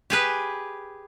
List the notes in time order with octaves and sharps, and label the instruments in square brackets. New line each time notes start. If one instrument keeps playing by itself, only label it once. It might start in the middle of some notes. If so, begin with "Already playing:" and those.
[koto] G4 G#4 B4